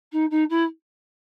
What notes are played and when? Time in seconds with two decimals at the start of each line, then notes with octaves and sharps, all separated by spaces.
0.12 D#4
0.31 D#4
0.50 E4